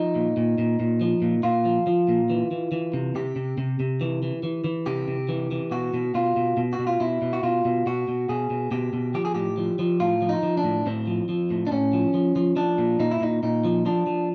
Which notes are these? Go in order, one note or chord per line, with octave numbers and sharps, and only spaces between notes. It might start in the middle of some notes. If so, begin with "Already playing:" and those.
Already playing: F3 D#4
A#2
A#2
A#2
A#2
F3
A#2
A#2 F4
F3
F3
A#2
E3
E3
E3
C3
C3 G4
C3
C3
C3
E3
E3
E3
E3
C3 G4
C3
E3
E3
B2 F#4
B2
B2 F4
B2
B2
F#4
B2
F4
B2 E4
B2
F#4
B2 F4
B2
B2 F#4
B2
B2 G#4
B2
B2 G4
B2
F3 G4
G#4
A2 G4
F3
F3
A2 F4
F3
D#4
F3
D4
A2
A2 C4
F3
F3
A2
D4
A2 C#4
F3
F3
F3
F3 D4
A#2
A#2 D#4
E4
A#2 D#4
A#2 D#4
F3
F3 D4
F3